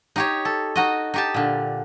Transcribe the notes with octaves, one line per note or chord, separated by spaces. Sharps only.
D#4 G4 C#5
A4
D#4 F#4 D#5
D#4 G4 A5
A#2 D3